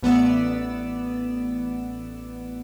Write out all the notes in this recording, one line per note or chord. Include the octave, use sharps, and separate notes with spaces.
A1 B3 D5 E6